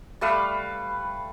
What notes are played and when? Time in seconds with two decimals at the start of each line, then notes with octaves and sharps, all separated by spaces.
0.21 G3 A3 B4 F5